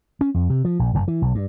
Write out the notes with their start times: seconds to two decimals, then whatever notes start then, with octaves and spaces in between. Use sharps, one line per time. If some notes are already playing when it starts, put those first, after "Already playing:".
0.21 C#4
0.34 F2
0.50 C3
0.65 F3
0.79 A#1
0.94 F#1
1.08 E3
1.22 B1
1.35 G2